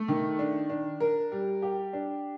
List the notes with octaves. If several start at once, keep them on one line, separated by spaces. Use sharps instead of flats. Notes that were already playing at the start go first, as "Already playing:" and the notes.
Already playing: A3
D#3
D4
D4
A#4
G3
G4
D4